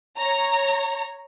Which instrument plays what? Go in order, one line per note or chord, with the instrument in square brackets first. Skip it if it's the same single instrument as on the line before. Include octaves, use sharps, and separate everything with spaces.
[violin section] C#5 A#5